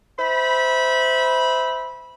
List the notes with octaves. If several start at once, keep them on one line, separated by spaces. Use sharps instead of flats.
C5 E5 B5